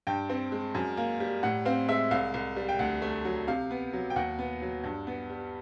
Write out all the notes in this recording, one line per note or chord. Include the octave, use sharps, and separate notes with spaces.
G2 G5
C4
G#3
F#2
A#3
G3
A2 F#5
C4 F5
G#3 E5
C2 F5
C2
G3
G5
D2 F#5
A3
F#3
C3 F5
B3
F#3
G5
D#2 F#5
B3
F#3
G2
B3
G3